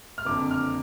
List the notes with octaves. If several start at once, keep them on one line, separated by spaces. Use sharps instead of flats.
F6
F#1 F2 D3 D6
F6